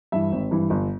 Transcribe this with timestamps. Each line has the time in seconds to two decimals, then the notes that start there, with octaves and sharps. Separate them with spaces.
0.12 G2 E3 E5
0.32 G#1
0.51 G2 E3
0.70 G1